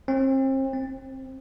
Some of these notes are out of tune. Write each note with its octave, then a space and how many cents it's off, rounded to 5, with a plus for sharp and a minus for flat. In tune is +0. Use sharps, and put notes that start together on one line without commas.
C4 +35
C4 +15